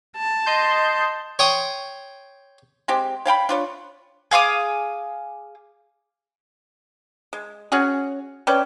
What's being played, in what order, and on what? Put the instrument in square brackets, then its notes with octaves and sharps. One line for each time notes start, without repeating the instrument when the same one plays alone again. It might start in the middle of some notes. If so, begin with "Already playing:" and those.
[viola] A5
[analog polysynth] D#5 C6 G6
[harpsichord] C#5 G5 C6 D#6
[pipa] G#3 C4 G4
C#5 F5 G5 B5
D4 F4 C#5
[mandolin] G#4 F5 D6 D#6
[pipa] G#3
C#4 F#4 G#4
C#4 B4 D5 G5